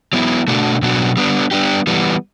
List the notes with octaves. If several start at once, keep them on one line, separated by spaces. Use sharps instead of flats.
F#3 B3 E4
B2 A3 D4 F#4
B2 F#3 B3 D4 F#4
G3 B3 D4
G3 B3 D4 G4
E3 G3 B3